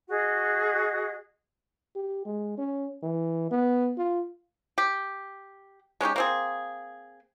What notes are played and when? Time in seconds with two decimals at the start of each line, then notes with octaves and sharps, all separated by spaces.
0.08 F#4 G#4 D#5
1.95 G4
2.26 G#3
2.58 C#4
3.03 E3
3.51 B3
3.98 F4
4.78 G4
6.01 G#3 C#4 D#4 G4
6.16 A#3 C4 G#4